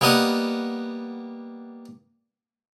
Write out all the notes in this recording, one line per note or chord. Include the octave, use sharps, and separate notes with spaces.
G3 A#3 B3 D#5 F#5